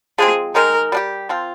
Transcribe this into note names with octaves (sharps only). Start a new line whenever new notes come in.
F3 G#3 C4 G#4
D#3 G#3 D#4 A#4
G3 D4 G4
F3 C4 F4